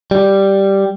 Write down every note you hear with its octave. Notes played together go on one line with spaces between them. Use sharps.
G3